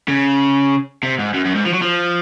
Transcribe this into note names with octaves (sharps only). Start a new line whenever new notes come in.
C#3
C3
G#2
F#2
F#2
G#2
F3
F#3
F3